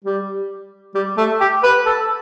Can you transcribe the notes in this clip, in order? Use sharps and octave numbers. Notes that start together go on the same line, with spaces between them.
G3
G3
A3
G4
B4
A4